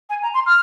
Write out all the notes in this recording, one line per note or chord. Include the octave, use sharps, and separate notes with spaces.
G#5
A#5
C6
F6